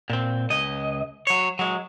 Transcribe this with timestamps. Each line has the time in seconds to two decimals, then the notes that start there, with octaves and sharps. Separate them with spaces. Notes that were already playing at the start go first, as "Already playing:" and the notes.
0.10 A#2 C4
0.50 C#2 D#5
1.27 F#3 C#5
1.59 F#3 G#3